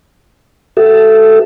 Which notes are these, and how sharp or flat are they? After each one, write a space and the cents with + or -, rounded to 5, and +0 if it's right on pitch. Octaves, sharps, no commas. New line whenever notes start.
F#4 +45 A4 +0 E5 +20